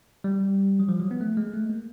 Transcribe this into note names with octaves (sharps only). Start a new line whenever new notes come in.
G3
F#3
F3
F#3
B3
A3
G#3
A3
A#3